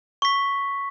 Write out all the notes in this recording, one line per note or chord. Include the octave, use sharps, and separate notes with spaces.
C#6 B6